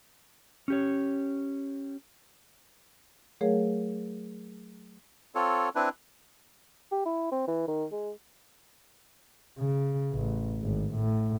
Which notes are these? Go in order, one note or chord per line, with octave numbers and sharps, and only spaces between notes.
C#4 G4 C#5
F#3 A3 G#4 A#4 C#5 F5
C4 F4 A4 C#5
C4 D4 E4 B4
G4
E4
C4
E3
D#3
G#3
C#3
A1
G#1
A2